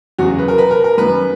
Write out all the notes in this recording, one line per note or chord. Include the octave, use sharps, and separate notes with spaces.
E2 C#3 F#3 F#4
B4
A#4
B4
A#4
A#4
F#2 D#3 F#3 B4